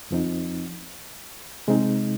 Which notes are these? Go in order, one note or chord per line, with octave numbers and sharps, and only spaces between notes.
F2 F3 C4 D#4
C3 G#3 C4 D#4